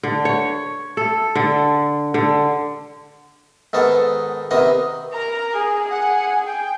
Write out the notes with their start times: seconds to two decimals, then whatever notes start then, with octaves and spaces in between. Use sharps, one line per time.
0.03 D3
0.25 C#5
0.97 A4
1.35 D3
2.14 D3
3.73 G#2 D#3 B3 A4
4.51 C3 D#3 B3 D#5
5.13 A#4 A#5
5.54 G#4
5.90 G#4 F#5 G#5
6.45 G5